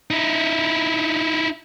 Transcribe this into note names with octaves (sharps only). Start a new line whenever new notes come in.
D#4 E4